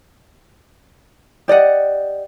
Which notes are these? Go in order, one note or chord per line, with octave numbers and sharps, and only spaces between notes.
G4 D5 D#5 F#5